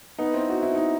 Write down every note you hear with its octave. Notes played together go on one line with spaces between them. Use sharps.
B3 D#4
C4 E4
F#4
E4
D#4